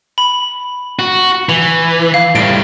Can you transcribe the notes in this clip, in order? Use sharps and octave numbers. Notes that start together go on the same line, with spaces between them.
B5
F#4
E3 F7
F5
A2 G3 D7